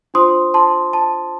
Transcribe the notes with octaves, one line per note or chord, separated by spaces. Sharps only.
D4 F4 C5 C6 D#6
A5 C6
A5